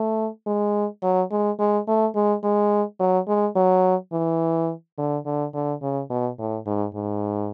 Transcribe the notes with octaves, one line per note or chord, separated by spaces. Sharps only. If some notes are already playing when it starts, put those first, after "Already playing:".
Already playing: A3
G#3
F#3
G#3
G#3
A3
G#3
G#3
F#3
G#3
F#3
E3
D3
D3
D3
C#3
B2
A2
G#2
G#2